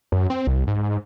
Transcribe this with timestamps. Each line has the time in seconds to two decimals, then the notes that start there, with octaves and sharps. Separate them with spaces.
0.12 F#2
0.30 C4
0.47 C2
0.67 G#2